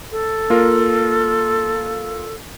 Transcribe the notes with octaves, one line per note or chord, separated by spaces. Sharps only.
A4
A#3 F4 A#4